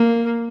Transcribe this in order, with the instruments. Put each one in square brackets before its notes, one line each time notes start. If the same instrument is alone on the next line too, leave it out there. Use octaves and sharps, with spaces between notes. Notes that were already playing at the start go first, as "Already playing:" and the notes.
Already playing: [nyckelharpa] A#3